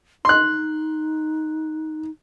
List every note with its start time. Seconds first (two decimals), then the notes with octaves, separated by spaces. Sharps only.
0.25 D#4 C6 F#6